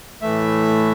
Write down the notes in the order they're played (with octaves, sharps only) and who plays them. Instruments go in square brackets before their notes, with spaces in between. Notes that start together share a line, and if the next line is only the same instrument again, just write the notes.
[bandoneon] A2 E3 A3 E5